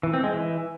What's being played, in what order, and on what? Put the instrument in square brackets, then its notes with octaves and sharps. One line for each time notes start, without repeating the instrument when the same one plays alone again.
[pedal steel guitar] E3
C4
G#3
E3